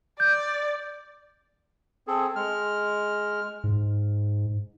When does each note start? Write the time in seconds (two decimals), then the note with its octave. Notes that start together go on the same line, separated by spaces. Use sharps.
0.20 D5 G6
2.07 C4 G#4 A4
2.36 G#3 F6
3.64 G#2